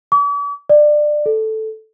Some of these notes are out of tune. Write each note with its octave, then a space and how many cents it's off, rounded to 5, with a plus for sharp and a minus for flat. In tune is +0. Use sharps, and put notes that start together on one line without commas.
D6 -45
D5 +20
A4 -5